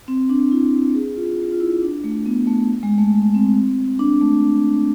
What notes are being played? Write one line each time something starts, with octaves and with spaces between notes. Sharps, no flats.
C4
D4
E4
G#4
F4
F4
E4
D4
A3
B3
A3
G#3
A3
C4
D4
A3